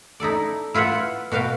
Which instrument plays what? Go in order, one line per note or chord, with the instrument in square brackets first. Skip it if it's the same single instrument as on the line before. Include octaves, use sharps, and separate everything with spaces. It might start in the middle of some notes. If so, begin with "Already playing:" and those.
[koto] D#4 E4 A4 D5
E4 F4 B4 E5 F#5
B2 F#4 B4 F5 G5